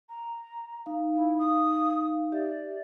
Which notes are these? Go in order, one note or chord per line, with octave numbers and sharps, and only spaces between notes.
A#5
D#4 F5
E4
D#6
G4 D5 E5